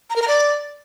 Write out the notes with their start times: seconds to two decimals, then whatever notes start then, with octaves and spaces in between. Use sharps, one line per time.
0.10 A#5
0.16 A#4
0.22 A#5
0.28 D5